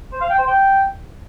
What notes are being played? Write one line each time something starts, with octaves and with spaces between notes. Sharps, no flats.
C5
F5
G5
C5
G5